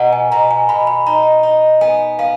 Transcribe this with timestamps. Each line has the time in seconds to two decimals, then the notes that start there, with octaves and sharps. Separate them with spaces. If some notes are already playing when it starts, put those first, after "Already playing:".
Already playing: B2 F#5 G#5 A#5
0.13 G#5
0.32 B2 A#5
0.51 G#5
0.69 B2 B5
0.87 B5
1.06 D#4 A#5
1.43 D#4
1.81 B3 G#5
2.19 B3 F5